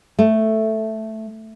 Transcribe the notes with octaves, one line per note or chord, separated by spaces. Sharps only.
A3